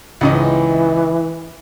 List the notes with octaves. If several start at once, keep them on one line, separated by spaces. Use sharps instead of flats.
C#2 G#2 E3 D#5